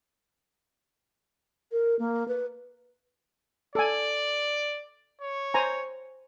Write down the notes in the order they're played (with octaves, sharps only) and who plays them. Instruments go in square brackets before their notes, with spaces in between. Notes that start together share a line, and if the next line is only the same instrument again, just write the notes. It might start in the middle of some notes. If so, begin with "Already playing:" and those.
[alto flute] A#4
A#3
B4
[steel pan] A4 G#5 [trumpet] D5
[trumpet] C#5
[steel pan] C5 G#5 A#5